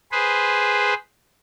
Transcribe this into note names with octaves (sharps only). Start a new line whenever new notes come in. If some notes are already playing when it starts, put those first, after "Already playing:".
G#4 B4 C5